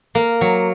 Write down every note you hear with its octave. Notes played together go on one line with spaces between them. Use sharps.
A#3
F#3